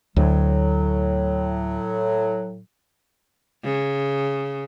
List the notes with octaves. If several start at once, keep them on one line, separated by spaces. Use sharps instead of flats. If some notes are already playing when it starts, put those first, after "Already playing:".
D2 A2 F#3
C#3